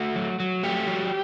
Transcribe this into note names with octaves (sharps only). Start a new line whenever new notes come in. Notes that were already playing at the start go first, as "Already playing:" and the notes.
Already playing: A3 F#4
F#3
F#3
A3 G4
F#3